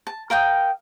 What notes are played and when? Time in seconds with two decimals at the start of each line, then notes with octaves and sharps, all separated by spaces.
0.07 A5
0.30 A#4 F5 G5 D#6